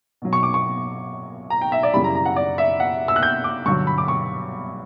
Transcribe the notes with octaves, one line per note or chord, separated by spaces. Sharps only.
B2 F#3
C#6
D6
C#6
A#5
G5
E5
D5
F#2 C#3 E3 G3 B5
A#5
A#5
F#5
D5
E5
F#5
E6
F#6
G6
D6
G2 D3 F#3 C#6
B5
D6
C#6